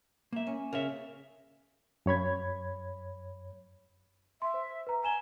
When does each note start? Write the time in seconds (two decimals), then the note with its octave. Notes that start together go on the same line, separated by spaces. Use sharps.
0.32 A#3 E5
0.47 C#4
0.73 C#3 A#4 C#5 E5
2.06 F#2 C#5 B5 G#6
4.42 E5 C6
4.54 C5
4.87 B4 A#5
5.04 G#5 A#5 E7 G7